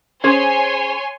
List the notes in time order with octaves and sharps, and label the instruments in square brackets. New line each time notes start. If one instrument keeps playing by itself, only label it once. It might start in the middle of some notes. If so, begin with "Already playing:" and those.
[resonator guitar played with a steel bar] C#4 G#4 C5 [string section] C#5 G#5 C6